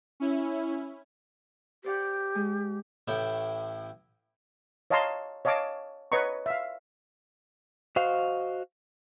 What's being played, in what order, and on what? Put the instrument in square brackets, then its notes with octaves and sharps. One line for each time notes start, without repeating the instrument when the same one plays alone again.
[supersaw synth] C#4 E4
[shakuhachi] G4 [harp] C5 D5 F#5
[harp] G#3
[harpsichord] A1 A2 E4 G5
[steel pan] C#5 D#5 F5 A5 A#5 C6
C#5 D#5 F5 A5 D6
B4 C#5 D#5 A#5 C#6
E5 F5
[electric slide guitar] F#4 C5 D#5 F5